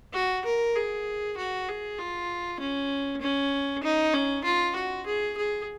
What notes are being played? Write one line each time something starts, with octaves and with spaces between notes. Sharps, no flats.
F#4
A#4
G#4
F#4
G#4
F4
C#4
C#4
D#4
C#4
F4
F#4
G#4
G#4